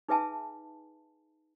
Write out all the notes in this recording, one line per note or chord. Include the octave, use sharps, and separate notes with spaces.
D#4 G#4 B4 E5 G#5 A5